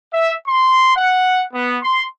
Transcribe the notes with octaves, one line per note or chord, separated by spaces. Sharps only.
E5
C6
F#5
B3
C6